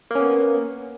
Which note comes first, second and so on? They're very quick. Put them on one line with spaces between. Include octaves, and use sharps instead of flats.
A#3 C#4 B3